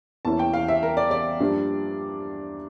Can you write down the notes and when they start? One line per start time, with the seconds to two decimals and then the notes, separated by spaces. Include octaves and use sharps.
0.25 E2 E3 A#3 C#4 E4 A5
0.39 G5
0.53 F5
0.68 E5
0.83 A#4
0.97 D5
1.11 D5
1.40 G2 F3 A#3 D4